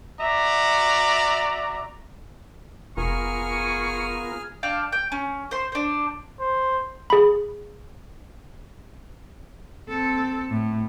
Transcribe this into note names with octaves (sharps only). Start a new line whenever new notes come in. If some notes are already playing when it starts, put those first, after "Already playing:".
F#4 D5 E5 A#5
F1 B3 F4 G#4 A#4 G#5 C#6 F6
D4 F5 G5 A5
G5
C#4
C5 C6
D4 C5
C5
G#4 B5
C4 A4
A2